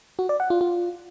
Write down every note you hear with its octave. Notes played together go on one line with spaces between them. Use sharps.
F#4
D5
F#5
F4
F4